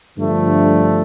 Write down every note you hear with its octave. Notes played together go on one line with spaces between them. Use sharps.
G2 D3 F3 A3